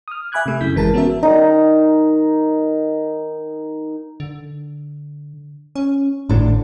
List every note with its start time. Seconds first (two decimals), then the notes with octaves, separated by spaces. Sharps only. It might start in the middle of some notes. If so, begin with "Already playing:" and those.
0.08 D#6 F6
0.32 E5 G#5 B5 D6 F#6 G#6
0.46 C3 A3
0.61 F#2 C#3 E4 G6 B6
0.75 G#1 E3 G#3 A#4 A5 A6
0.94 B3 C#4 F#4 A#4 E5
1.23 D#3 D#4
4.20 D3
5.76 C#4
6.29 G#1 A2 D3 D4